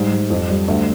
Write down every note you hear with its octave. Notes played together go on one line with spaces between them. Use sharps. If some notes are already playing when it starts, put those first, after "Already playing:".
Already playing: G#2 G3
G3
F2
G3
D2